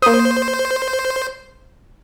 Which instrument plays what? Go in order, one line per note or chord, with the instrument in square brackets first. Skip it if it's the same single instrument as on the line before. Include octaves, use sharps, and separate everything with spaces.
[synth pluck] A#3 D#6 [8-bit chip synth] C5